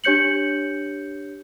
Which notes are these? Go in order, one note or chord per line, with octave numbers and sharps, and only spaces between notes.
D4 G4 C#5 G6 C#7 F#7